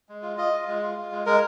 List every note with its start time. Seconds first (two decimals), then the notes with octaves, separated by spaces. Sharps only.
0.09 G#3
0.23 F4
0.37 F4 D#5
0.53 F4
0.68 G#3
0.82 F4
0.97 F4
1.12 G#3
1.26 G#3 A#4